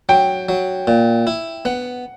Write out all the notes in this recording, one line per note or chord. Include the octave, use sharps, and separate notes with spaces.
F#3 G5
F#3
A#2
E4
B3 F#5